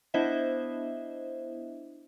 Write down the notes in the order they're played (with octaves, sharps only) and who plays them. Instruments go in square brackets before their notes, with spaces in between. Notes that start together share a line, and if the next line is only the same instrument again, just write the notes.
[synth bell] B3 D4 E4 C5 D#5 E5